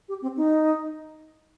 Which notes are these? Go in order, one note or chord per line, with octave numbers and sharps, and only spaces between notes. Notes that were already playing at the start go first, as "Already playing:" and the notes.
G4
C4
D#4